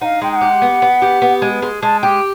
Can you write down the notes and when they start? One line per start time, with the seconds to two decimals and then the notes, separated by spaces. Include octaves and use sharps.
0.01 D#4 F5 F#5
0.22 G#3 G5
0.32 G5
0.36 F#5
0.41 G4
0.62 B3
0.82 B3
1.02 G4
1.22 B3
1.42 G#3
1.62 G#3
1.82 G#3 A5
2.02 G4 G5